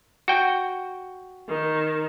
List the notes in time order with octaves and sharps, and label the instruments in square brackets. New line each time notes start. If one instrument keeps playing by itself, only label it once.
[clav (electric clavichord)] F#4 G5
[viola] D#3